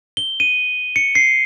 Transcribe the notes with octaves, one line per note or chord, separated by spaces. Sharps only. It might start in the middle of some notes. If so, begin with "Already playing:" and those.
G7
D#7
C#7
C7